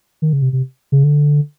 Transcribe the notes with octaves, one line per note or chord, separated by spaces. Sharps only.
D#3
C#3
C3
C3
C#3
D3